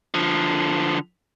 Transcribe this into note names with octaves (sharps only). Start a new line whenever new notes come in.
D3 F3